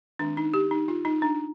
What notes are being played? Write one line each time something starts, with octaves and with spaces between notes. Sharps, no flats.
D#3 G#3 C4 D4
D#4
G4
D#4
F4
D#4
D4